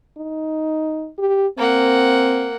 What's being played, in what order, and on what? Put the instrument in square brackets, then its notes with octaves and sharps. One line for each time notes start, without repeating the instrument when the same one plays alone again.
[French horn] D#4
G4
[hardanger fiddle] A#3 F#5 [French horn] C4